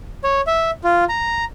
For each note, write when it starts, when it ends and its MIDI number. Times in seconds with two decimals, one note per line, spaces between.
0.24 0.41 73
0.47 0.71 76
0.84 1.04 65
1.09 1.45 82